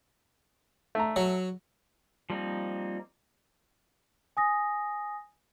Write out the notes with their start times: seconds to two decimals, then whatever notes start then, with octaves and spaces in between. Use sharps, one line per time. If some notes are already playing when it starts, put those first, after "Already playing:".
0.95 A3 A#5
1.16 F#3
2.30 F3 G3 A#3 C4 D#4
4.37 G#5 D#6 A#6